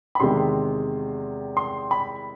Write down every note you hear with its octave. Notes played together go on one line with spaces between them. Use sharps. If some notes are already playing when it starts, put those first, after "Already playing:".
B5
E2 C3 D#3 G#3 C6
C6
B5